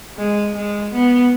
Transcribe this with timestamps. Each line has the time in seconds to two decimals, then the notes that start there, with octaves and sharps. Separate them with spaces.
0.17 G#3
0.55 G#3
0.92 B3